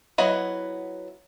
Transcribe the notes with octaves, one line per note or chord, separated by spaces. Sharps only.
F#3 B3 E4 D#5 F#5